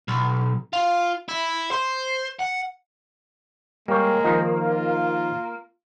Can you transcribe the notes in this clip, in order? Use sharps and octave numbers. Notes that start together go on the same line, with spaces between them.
B1
F4
E4
C5
F#5
G3 G#3 A#3 C#5
D#3 F3 D#4
F4